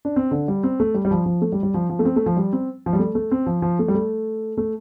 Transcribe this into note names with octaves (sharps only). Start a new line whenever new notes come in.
D4
C4
D3
G3
C4
A3
G3
G3
F3
F3
A3
G3
G3
F3
F3
A3
C4
A3
F3
G3
C4
F3
G3
A3
A3
C4
F3
F3
A3
G3
A3
A3